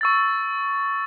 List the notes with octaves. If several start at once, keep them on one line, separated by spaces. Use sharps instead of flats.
C#6 E6 A6